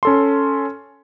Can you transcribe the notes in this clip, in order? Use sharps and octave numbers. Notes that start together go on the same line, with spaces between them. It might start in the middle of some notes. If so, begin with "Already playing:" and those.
C#4 A4 C6